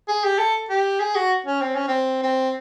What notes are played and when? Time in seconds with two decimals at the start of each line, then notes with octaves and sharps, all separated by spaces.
0.08 G#4
0.24 G4
0.39 A4
0.70 G4
1.00 G#4
1.15 F#4
1.47 C#4
1.62 C4
1.75 C#4
1.88 C4
2.23 C4